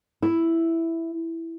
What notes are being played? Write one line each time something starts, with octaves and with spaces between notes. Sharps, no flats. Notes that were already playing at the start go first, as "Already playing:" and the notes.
E4